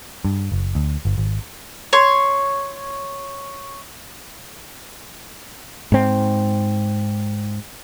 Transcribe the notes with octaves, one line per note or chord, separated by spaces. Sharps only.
G2
F#1
D2
G1
G#1
C#5 C6
G#2 C4